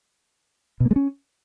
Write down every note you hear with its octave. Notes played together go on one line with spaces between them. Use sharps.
B2
A#3
G#3
C#4